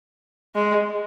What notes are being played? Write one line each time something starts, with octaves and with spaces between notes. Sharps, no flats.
G#3